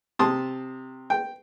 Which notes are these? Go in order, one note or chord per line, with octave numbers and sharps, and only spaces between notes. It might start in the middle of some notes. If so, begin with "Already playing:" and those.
C3 A5 C6 D#6
G5